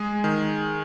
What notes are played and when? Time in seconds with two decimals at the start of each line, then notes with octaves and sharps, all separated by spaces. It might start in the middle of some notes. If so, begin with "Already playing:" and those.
Already playing: G#3 G#4
0.24 D#3